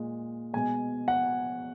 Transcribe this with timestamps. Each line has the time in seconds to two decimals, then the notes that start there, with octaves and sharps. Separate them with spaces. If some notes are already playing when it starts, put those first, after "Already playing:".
Already playing: A#2 G#3
0.53 B2 G#3 G#5
1.08 F#5